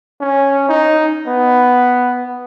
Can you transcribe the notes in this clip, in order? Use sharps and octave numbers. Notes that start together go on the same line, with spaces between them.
C#4
D#4
B3